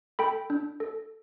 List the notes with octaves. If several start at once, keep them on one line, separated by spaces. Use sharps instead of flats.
A4 G5 B5
D4
A4